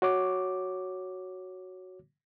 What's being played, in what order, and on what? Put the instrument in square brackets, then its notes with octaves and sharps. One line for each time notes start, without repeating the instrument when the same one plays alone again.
[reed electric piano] F#4 C#5 D6